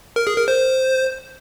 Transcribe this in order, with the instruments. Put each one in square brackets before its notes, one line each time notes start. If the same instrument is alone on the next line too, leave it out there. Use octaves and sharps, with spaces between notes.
[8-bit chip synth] A#4
G#4
A#4
C5